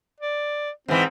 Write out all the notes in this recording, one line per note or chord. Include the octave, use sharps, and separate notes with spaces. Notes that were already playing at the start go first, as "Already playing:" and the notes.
D5
G#2 E3 C4